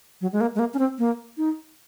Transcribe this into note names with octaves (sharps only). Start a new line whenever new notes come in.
F#3
G#3
A#3
G#3
A#3
C#4
C4
A#3
D#4